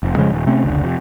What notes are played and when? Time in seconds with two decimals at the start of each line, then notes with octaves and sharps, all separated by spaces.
0.03 F1
0.16 F2 C#3 F3 G#3
0.30 D#1
0.46 C3 A3 C4 C#4
0.63 F1 C#2 D3
0.83 F2 C3